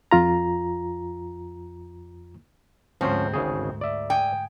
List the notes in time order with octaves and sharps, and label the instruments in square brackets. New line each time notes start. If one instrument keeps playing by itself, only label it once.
[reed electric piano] F2 F4 A#5
[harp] D2 G#2 [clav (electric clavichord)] F3 C#4 C5 [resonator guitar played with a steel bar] C4
[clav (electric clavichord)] G#1 C#3 G#4
D5 E5
[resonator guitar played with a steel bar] G5 [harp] G#5 D#6